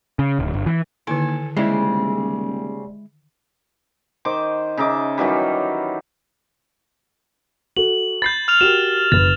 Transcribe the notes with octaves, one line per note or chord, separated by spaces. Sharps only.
C#3
D1
G1
E3
D#2 D3 D#3 E4 A4 G#5
D#1 C#3 G3 G#3 C4 E4 D5
D#3 C5 D6
C#3 D#4 E5 D6
D#3 E3 F#3 G3
F#4 A4 F#7
B5 G6 A6 C7
F6 F7
F#4 G4 A#4 E7
F#1 B4 A6